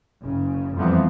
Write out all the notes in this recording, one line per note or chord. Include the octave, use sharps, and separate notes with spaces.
F#1 C#3
F2 E3 F3 G3 B3 C4